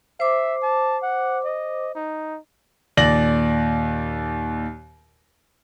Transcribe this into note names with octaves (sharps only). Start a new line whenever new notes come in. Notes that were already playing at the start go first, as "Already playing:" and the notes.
C5 E5 D6
A5
F#5
D#5
D#4
D#2 A#2 D5 A#6 F#7